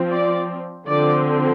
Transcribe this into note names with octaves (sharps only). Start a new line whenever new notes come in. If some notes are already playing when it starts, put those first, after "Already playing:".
Already playing: F3 C4
D5
D3 F3 C4 D5